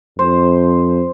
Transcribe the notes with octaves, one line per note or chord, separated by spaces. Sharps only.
F2 C5